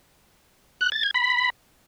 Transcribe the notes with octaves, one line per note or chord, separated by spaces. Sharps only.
F#6
A6
G#6
B5